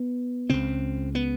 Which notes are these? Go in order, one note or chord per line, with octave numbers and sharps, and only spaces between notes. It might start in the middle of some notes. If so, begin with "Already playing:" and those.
Already playing: B3
C#2 C#3 C4
B3